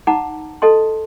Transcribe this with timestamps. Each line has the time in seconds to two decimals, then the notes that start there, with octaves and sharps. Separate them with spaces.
0.07 D#4 F#5 A5 A#5 D6
0.62 A4 D#5 A5 C6